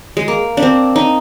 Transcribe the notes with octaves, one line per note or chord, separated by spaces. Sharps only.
G#3
A#3
D4
C4
D#4